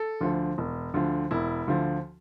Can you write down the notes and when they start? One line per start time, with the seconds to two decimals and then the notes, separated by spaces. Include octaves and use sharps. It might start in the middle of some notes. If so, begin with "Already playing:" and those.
Already playing: A4
0.21 D2 D3 F3
0.58 E1
0.94 D2 D3 F3
1.31 E1 E4
1.67 D2 D3 F3